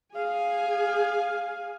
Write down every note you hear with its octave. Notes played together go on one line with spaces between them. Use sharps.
G#4 F5 G#5